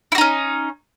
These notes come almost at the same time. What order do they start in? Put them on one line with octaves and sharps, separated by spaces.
E4 F#4 D#4 C#4